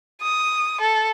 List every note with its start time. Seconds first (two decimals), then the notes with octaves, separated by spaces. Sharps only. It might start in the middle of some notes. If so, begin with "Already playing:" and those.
0.22 D#6
0.81 A4